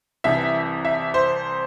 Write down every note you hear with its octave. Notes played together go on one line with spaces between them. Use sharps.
C2 C3 E3 E5
E5
C5